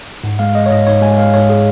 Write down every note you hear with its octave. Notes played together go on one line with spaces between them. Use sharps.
G#2
G#3 F5
G#3 D#5
C#5
G#2 D#5
G#2 C#5
G#3 G#5
G#3 F5
G#2 C#5
G#4